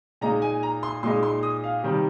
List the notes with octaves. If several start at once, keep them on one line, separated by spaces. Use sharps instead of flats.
A#2 G#3 D#4 A#5
G#5
A#5
C6
A#2 G#3 D#4 C6
C6
D#6
F5
C3 D#3 G3